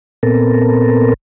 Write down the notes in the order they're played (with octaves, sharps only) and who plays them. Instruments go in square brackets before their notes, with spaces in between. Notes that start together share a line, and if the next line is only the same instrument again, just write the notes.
[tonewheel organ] A#2 B3 C4 A4 A#4